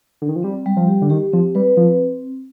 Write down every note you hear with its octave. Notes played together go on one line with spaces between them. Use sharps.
D3
D#3
F3
G3 C4
G3
F3
G4
D3
D#3 G4
F3 C4
G3 B4
F3 C4